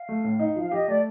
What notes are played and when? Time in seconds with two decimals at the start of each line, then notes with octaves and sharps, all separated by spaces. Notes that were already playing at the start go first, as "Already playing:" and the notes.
Already playing: F5
0.09 A3
0.24 A2
0.39 D#4
0.56 F3 F5
0.72 G4 D#5
0.88 A3 D5